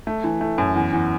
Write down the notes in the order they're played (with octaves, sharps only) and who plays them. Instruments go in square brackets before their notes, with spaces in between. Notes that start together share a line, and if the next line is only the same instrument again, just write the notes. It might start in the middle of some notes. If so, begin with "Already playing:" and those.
[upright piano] A3
E3
A3
F#2
E2
E2